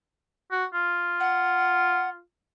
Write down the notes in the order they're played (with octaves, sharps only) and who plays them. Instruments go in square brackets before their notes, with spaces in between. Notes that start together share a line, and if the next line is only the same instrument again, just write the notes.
[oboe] F#4
F4
[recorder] F#5